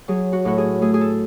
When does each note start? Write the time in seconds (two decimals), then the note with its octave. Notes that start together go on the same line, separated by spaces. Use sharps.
0.08 F#3 G#4
0.33 F#4
0.45 A2 F#4
0.58 G#4
0.81 A3 G#4
0.94 G#4
1.01 A4